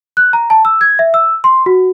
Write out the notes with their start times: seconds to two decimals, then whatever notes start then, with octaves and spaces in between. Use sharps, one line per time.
0.17 F#6
0.33 A#5
0.50 A5
0.65 E6
0.81 G#6
0.99 E5
1.14 E6
1.44 C6
1.66 F#4